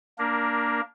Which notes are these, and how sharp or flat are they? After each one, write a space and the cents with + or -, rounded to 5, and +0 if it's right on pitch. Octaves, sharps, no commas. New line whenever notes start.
A#3 +0 D4 +0 A#4 +20